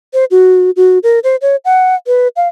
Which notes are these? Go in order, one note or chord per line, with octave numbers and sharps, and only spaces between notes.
C5
F#4
F#4
A#4
C5
C#5
F#5
B4
F5